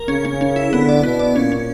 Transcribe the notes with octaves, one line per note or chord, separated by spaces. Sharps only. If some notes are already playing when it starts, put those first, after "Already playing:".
Already playing: A#4
C#3 C#4
C#4
C#4
E4
D3 B3
D5
B2 B3
D5
A#2 C#4
C#4